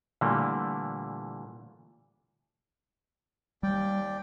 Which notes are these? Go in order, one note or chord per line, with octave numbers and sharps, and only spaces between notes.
A#2 D3 E3 G3 A3 A#3
D#2 G3 D5 G5